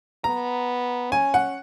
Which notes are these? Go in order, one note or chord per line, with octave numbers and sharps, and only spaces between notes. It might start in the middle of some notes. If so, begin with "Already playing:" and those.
B3 A#5
C#4 G#5
F#5